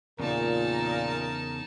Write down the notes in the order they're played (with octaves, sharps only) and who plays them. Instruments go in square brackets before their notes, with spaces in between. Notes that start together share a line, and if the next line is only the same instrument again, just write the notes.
[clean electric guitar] E2 C#3 [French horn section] A#2 [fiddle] D#4 A5 [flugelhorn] A#4